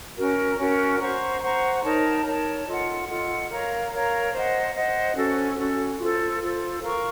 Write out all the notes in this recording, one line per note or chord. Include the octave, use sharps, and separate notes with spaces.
C#4 F#4 A#4
C#4 F#4 A#4
C5 F#5 A#5 C#6
C5 F#5 A#5 C#6
D#4 A#4 C#5 A5
D#4 A#4 C#5 A5
F4 A4 D#5 F#5
F4 A4 D#5 F#5
A#4 C#5 F5 A#5
A#4 C#5 F5 A#5
C5 D#5 F#5
C5 D#5 F#5
C#4 F#4 A4
C#4 F#4 A4
F4 A4 C5
F4 A4 C5
A#4 F5 A#5 C#6